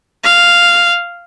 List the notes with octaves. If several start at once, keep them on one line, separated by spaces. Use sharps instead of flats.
F5